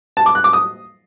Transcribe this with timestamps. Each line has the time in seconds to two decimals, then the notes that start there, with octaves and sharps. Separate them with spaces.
0.17 A5
0.26 D6
0.35 F#6
0.44 D6
0.53 D#6